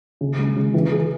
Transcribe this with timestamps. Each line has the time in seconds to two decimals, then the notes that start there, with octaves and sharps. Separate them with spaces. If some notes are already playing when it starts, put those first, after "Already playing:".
0.21 C#3
0.39 G#3
0.57 C#3
0.74 E3
0.92 G#4